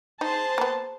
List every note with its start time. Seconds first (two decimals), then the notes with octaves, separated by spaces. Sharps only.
0.21 D#4 G#4 C5 A5 C6
0.58 A#3 B3